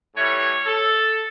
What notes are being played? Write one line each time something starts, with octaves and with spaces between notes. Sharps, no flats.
A2 E3 G3 C#5
A4